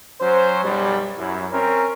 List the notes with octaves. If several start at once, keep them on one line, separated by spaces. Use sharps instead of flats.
F#3 C#4 C5
B1 F#2 G3
F#2 E4
C4 C#4 A#4